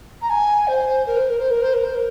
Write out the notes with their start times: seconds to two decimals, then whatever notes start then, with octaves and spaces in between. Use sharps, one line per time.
0.21 A#5
0.29 G#5
0.67 C5
1.06 A#4
1.16 C5
1.28 A#4
1.39 C5
1.50 A#4
1.62 C5
1.73 A#4
1.83 C5
1.94 A#4